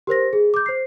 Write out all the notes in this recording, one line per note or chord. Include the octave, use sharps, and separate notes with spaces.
G4 A#4 C5 A#6
G#4
D6 G6
C5 C7